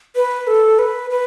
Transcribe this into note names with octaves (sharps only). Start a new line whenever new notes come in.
B4
A4
B4
B4